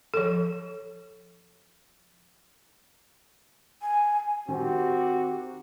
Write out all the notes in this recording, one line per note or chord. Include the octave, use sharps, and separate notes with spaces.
F3 A4
G#5
D#3 C4 F#4 G4